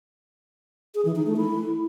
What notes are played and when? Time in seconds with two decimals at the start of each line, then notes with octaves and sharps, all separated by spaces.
0.95 G#4
1.05 E3
1.16 D#4
1.26 A3
1.37 E4